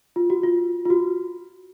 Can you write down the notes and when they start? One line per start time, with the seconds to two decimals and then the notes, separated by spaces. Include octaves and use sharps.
0.16 F4
0.30 F#4
0.44 F4
0.85 F4
0.90 F#4